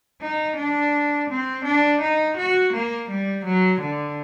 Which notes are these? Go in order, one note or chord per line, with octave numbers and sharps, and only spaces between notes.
D#4
D4
C4
D4
D#4
F#4
A#3
G3
F#3
D3